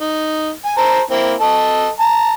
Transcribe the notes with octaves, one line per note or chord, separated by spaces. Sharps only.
D#4
G#5
C5 A5 A#5
A#3 C4 E4
A4 D#5 A5
A5 A#5